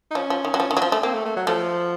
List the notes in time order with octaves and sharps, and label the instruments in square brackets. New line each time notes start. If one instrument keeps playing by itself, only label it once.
[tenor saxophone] D#4
[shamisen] F3 [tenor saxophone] C#4
[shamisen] F3
D#3
F#3
F3
D#3
F#3
F3
A3
[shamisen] A#3 [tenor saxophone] C4
[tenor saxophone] A3
A3
F#3
[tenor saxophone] F3 [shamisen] A3